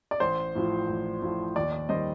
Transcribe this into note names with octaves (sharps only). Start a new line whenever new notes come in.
D5
A1 C5
A2 F3
A1
A2 F3
D#2 D5
D5
D#3 G3 C5 D#5